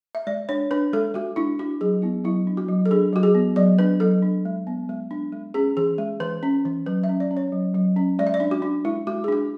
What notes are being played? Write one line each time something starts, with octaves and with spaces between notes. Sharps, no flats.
E5
G#3 D5
D4 C#5
D4 B4
G#3 A4
G#3 F#4
D4 E4
D4 F#4
F#3 G#4
B3 E4
F#3 E4
D4
F#4
F#3
A4
D4 G#4
F#3 F#4
G#4
B3
F#3 D5
D4 B4
F#3 A4
D4
G#3
B3
G#3
D4
G#3
C#4 G#4
E3 G#4
G#3
E3 B4
C#4
E3
F#3 B4
E5
C#4
D5
C#4
C#5
F#3
F#3
C#4
G#3 D5
E5
D5
D4
F#4
D4
G#3 E4
G#3 F#4
G#4
D4 F#4